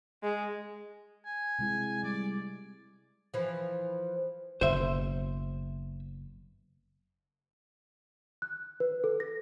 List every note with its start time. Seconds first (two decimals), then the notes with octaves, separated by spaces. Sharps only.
0.23 G#3
1.25 G#5
1.59 C3 G#3 E4
2.04 G3 D5
3.34 E3 F3
4.61 F#1 B2 C5 E5
8.42 F#6
8.80 B4
9.04 A4
9.20 A#6